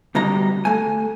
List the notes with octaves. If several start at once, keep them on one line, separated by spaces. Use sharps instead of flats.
D2 B2 G3 D#5 A#5
A3 G#5